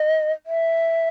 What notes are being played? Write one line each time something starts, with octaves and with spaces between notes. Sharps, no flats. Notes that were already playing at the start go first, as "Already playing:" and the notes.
Already playing: D#5
E5